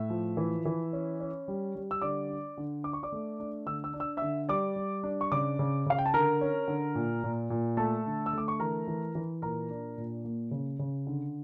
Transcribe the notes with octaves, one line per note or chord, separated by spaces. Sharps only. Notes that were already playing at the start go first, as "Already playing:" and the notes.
Already playing: A2 E5
F3
E3
E3
C#4
C#4
G3
G3
E6
D3 D5 D6
D4
D3
D4 D6
C#6
D5 D6
A3
D4
D3 E6
E6
D4
E6
D3 E5 E6
G3 D5 D6
G3
D4
C#6
C#3 D5 D6
C#3
C#3 F5
G5
A5
D3 A#4 A#5
C#4
D3
A#2
A#2
A#2
A3 A4 A5
D3
E6
A3 D6
C#6
E3 A#4 A#5
E3
E3
A#2 A#4 A#5
D4
A#2
A#3
C#3
C#3
D3